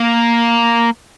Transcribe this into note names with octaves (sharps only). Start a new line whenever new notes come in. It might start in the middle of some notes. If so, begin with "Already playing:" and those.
Already playing: A#3